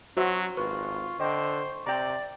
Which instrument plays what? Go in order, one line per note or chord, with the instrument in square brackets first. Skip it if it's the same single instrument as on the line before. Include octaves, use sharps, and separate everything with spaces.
[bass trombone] F#3 [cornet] C#4 [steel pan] F#4 C5 E5
[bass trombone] G#1 [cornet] F4 [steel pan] B4 [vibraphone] C#6
[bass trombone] D3 [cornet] C5 [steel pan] D#5 G5 D6
[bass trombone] C3 [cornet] D5 [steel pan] G5 A#5